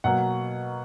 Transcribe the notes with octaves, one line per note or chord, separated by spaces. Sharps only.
B2 F#3 A#3 F#5